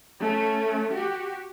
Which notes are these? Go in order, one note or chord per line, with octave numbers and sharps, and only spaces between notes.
A3 C#4
F#4 G4